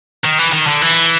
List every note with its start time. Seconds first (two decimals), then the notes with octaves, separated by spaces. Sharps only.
0.24 D#3
0.38 E3
0.53 D#3
0.67 D3
0.82 E3